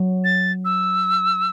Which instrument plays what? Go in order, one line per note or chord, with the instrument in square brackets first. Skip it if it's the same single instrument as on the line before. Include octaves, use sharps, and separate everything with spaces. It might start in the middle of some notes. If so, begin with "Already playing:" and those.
Already playing: [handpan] F#3
[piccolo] A6
E6